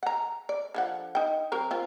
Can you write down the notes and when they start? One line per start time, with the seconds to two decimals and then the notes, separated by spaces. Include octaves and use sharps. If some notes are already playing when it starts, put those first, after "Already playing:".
0.03 F#5 A#5
0.49 D5
0.75 D3 F3 F#5
1.15 D#4 G5
1.52 F#3 C4 A#4
1.71 C4 F4